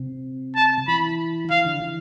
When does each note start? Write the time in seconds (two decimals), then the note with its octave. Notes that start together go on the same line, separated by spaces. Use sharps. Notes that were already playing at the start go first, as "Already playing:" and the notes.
Already playing: C3
0.56 A5
0.88 E3 B5
1.50 E3 F5
1.66 D3
1.82 E3